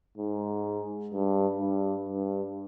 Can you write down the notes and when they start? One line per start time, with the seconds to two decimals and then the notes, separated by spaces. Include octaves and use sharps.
0.17 G#2
1.14 G2
1.61 G2
2.09 G2